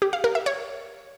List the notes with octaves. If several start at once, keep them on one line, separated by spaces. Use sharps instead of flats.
G4
F5
A#4
E5
C#5